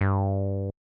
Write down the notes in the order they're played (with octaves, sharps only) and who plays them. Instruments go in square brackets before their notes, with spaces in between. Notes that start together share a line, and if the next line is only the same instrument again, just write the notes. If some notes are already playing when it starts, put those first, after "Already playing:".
[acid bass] G2